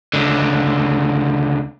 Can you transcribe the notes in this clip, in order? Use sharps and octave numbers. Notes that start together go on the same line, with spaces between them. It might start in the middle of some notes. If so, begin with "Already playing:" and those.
C#2 D3